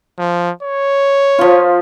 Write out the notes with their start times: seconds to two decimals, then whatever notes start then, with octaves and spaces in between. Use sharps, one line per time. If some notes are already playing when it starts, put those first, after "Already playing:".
0.19 F3
0.63 C#5
1.39 F3 F4